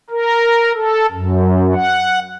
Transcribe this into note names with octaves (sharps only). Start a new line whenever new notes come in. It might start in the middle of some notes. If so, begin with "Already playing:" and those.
A#4
A4
F#2
F#5